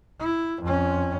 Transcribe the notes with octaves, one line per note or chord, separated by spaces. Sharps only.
E4
F2 C#4